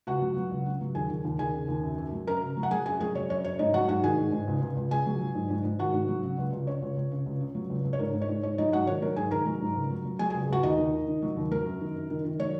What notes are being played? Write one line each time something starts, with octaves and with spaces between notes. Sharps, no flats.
C#2 F#4 F#5
F#3
F#3
C#2
C#3
F#3
D#2 G#4 G#5
D#2
D#2
D#2 G#4 G#5
C#3
D#2
F#2
F#2
F#3
F#2 A#4 A#5
C#3
F#3
F#5
F#3 G#4 G#5
F#2 G#4 G#5
F#3 G#4 G#5
F#3 C#5
F#2 C#5
F#2 C#5
G#2 D#4 D#5
F#3 F#4 F#5
G#2 F#4 F#5
D#3 G#4 G#5
G#2
G#2
C#2
C#2
C#2
C#2 G#4 G#5
F#3
F#3
G#2
G#2
G#2
D#3 F#4 F#5
G#2
F#3
C#3
C#2
C#2
C#3 C#5
C#2
C#2
C#3
C#2
C#3
F#3
C#2
C#2
C#5
G#2 A#4
G#2
C#5
G#2
G#2 C#5
F#3 D#4 D#5
G#2 F#4 F#5
D#3 C#5
F#3 A#4
G#2 G#4 G#5
D#3 A#4 A#5
F#3
G#2
C#2
F#3
F#3
F#3 G#4 G#5
G#4 G#5
C#2
C#2 F#4 F#5
D#2 D#4 D#5
D#2
D#3
D#3
F#3
D#2
F#3 A#4
F#2
D#3
F#2
D#3
D#3
F#3 C#5